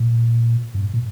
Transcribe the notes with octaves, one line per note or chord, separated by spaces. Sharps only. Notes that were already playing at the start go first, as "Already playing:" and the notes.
Already playing: A#2
G2
A#2